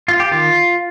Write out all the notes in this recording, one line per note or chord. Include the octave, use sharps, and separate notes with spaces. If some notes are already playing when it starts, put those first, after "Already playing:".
F4
G4
D#3 F4